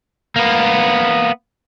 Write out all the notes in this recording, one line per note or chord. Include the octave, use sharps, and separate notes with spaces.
A#3 B3